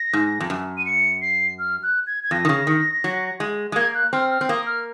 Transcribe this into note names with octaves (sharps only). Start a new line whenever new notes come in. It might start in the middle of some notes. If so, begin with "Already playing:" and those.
Already playing: A#6
G#2
F2
F#2
D#7
C#7
C7
F6
F#6
G#6
G#6
F2 A#6
D#3
C#3
D#3
F#3
G#3
G#3
A#3 G#6
F#6
C4 F6
F6
C4
A#3 D#6
F6